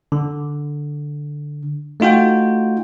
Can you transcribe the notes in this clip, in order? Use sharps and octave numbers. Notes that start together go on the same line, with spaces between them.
D3
A3 D#4 F4 F#4 G5